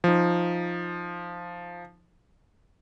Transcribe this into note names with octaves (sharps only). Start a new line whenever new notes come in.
F3 D#4